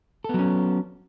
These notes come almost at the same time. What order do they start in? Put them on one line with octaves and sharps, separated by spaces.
A4 B3 F#3 C#4